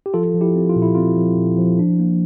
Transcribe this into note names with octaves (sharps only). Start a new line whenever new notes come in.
G4
F3 F4 A4
F3
E4 G4
C4
F4
A#2
E4
C4 F4
F3
A#2
F3
D4
A#3